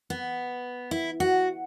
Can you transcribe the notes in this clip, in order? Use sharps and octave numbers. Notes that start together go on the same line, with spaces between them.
B3
E4
F#4